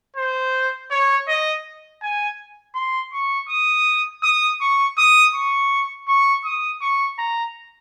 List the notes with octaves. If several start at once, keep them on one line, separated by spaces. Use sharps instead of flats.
C5
C#5
D#5
G#5
C6
C#6
D#6
D#6
C#6
D#6
C#6
C#6
D#6
C#6
A#5